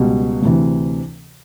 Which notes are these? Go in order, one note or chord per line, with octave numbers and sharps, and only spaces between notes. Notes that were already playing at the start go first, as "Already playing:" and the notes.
Already playing: C#2 B2 G3
D2 C3 E3